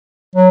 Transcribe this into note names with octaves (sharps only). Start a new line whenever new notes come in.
F#3